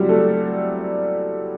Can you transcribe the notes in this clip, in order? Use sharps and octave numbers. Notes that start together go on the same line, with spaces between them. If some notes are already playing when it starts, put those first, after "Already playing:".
Already playing: F#3 G3 C4 E4 F#4 G4
A3 A4